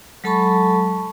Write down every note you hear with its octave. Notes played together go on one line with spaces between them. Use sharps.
F#3 G#3 A4 A5 B5 C#6